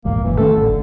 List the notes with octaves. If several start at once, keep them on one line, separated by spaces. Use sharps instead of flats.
A#1 E2 G#2 A#3
F#1 F#2 A#2 E3
D#3 A3 C#4 A4
A1 D3
F#1